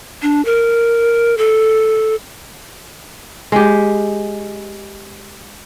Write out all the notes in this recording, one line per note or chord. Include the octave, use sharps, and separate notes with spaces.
D4
A#4
A4
G#3 G4